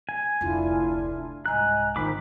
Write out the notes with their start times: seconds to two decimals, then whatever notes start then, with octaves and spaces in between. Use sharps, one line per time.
0.09 G#5
0.41 F1 D2 D4 E4 F4
1.46 C2 G#2 D#5 G#5 A#5 F#6
1.96 G#1 D#3 D4 F4 C5 B5 D6